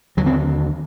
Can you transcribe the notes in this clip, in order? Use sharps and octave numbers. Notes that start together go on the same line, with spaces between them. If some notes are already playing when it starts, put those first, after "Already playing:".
D#2 D3 F#3
C4